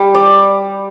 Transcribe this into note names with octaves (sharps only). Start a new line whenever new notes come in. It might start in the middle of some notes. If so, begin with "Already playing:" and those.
Already playing: G3
D5